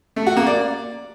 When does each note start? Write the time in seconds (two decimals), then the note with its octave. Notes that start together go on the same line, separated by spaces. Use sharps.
0.16 A3
0.26 F#4
0.36 A#3
0.47 D5